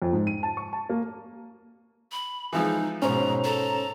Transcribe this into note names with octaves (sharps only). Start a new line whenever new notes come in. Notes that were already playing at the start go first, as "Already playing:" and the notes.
F2
G#2
D#7
A5
C#6
A5
A#3
B5
E3 F3 G#3 D#4
G#2 B2 C#4 C5 C#5 A#5
A4 A#5